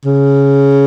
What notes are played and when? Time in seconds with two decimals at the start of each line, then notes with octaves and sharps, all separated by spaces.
0.05 C#3